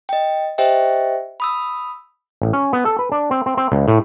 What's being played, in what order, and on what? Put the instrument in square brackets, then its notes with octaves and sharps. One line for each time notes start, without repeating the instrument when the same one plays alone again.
[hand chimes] D#5 G5
G4 C5 D#5 E5 G5
B5 D#6 E6
[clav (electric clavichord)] A1
C#4
B3
A4
B4
D4
C4
C4
C4
C#2
A2